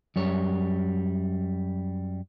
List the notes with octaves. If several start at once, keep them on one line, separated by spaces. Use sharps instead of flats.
F#2 G3 C#5